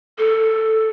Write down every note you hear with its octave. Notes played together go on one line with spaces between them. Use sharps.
A4